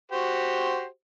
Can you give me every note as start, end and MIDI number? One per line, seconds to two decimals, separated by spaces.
0.12 0.85 66
0.12 0.85 67
0.12 0.85 72